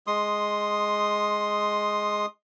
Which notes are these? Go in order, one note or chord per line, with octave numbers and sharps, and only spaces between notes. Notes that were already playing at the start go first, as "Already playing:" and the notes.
G#3 C6 D#6